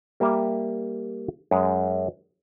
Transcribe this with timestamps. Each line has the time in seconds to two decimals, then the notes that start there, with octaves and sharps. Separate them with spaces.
0.20 G3 A#3 G4 E5
1.51 F#2 G#3